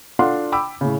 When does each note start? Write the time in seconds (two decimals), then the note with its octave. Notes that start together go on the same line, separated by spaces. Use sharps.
0.19 D4 F4 A4 F5 F#5 C6
0.52 G5 B5 D6 E6
0.81 A2 C#3